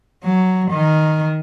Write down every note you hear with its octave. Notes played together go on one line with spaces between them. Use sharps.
F#3
D#3